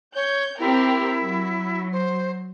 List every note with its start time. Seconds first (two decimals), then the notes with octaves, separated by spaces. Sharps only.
0.15 C#5 G6
0.59 C4 E4 G4 A#4
1.23 F#3
1.92 C5